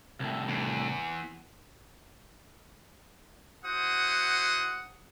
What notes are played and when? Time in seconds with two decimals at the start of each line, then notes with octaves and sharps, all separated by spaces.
0.20 C2 A2
0.49 E2
3.65 E4 F#4 C5 F#5 D#6